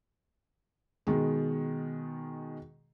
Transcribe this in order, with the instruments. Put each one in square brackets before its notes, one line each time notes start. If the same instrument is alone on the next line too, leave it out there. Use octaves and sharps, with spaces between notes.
[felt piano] B2 D#3 G#3